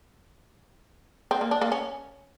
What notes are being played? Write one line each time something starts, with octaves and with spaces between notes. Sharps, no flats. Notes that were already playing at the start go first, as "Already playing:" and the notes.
C4
A#3
D4
A#3
C#4